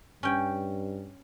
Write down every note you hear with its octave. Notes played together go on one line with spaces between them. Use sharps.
G2 C#4 G5